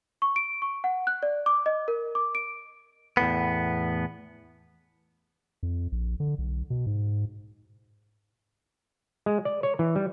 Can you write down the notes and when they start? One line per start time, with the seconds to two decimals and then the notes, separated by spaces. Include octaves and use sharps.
0.22 C#6
0.36 D7
0.62 C#6
0.84 F#5
1.07 F#6
1.23 D5
1.46 D6
1.66 D#5
1.88 A#4
2.15 D6
2.35 D7
3.17 E2 A2 B3
5.63 F2
5.92 A#1
6.20 D3
6.38 B1
6.70 B2
6.87 G#2
9.26 G#3
9.45 D5
9.63 C#5
9.79 E3
9.96 G3